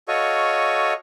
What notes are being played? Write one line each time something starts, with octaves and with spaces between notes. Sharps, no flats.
F#4 A4 C#5 D#5 F5 C#6